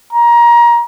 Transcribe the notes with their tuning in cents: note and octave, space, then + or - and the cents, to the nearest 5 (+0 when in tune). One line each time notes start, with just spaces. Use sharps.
A#5 +25